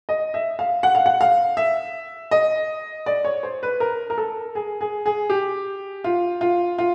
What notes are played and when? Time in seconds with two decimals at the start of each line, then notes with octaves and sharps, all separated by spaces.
0.09 D#5
0.34 E5
0.59 F5
0.83 F#5
0.95 F5
1.06 F#5
1.21 F5
1.57 E5
2.31 D#5
3.06 D5
3.24 C#5
3.43 C5
3.63 B4
3.80 A#4
4.10 A#4
4.18 A4
4.55 G#4
4.81 G#4
5.06 G#4
5.30 G4
6.04 F4
6.41 F4
6.78 F4